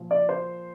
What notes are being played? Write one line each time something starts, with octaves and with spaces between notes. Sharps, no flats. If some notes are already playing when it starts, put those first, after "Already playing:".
Already playing: A#2 F3
D5
C5